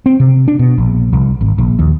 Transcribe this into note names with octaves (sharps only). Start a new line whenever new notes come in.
C4
C3
D4
B2
A#1
C2
G#1
A#1
D#2